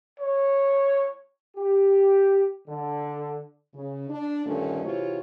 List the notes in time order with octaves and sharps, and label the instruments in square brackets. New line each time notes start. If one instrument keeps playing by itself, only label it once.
[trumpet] C#5
[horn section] G4
D3
[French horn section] C#3
D4
G2 A#2 D3 D#3 A3 C#4
C3 E3 C4 F4 F#4 C#5